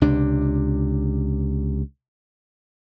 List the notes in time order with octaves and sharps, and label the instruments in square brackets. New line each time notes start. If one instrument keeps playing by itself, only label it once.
[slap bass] C#2 C3 D4